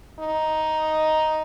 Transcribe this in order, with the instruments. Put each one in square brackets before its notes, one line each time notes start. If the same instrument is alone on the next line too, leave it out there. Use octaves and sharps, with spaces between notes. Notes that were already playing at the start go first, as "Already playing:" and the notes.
[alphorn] D#4